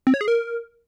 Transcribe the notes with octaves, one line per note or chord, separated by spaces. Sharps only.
C4
C#5
G#4
A#4